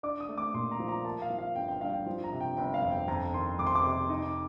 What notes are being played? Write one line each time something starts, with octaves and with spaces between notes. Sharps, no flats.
D4 D6
D#6
A3
D6
A#2 C6
A#5
F3
A#5
A#3 A5
F5
F3
F5
G1 G5
G5
G2 F5
G5
F3
A#5
C3
G5
G1 G5
F5
F2
G5
F2 A#5
D#3 C6
F2 D6
C6
D6
C3
D#4